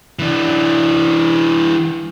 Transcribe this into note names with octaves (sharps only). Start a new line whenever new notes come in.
E3 D4